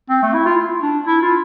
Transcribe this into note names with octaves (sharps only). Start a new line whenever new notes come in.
C4
A3
E4
F4
D4
E4
F4